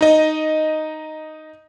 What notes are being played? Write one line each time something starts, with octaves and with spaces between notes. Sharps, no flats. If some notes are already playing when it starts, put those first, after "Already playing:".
D#4 D#5